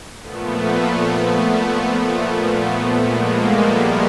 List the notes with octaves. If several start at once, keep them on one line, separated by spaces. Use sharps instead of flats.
A#2 F3 A3 B3
A3 B3
A#2 F3
G#3 A#3
G3